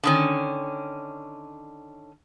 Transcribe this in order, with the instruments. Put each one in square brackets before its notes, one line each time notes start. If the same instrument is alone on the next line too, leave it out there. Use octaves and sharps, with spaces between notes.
[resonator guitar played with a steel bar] D3 D#3 C#4